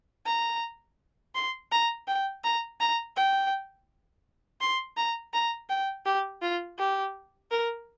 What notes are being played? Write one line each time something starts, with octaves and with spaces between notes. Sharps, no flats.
A#5
C6
A#5
G5
A#5
A#5
G5
C6
A#5
A#5
G5
G4
F4
G4
A#4